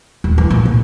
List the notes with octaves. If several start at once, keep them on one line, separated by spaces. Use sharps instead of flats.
D#1
E3
A#2
A#2